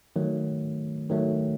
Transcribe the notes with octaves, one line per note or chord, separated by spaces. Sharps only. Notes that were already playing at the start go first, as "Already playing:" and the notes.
D#3 F#3 A3
D#3 F#3 A3